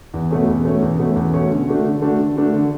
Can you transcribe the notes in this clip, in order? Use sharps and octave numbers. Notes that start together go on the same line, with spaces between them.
E2
B2 A3 C#4
E2
B2 A3 C#4
E2
B2 A3 C#4
E2
B2 A3 C#4
D3
A3 D4 F#4
D3
A3 D4 F#4
D3
A3 D4 F#4
D3